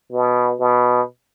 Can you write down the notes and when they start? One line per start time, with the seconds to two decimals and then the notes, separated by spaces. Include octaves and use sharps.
0.12 B2
0.60 B2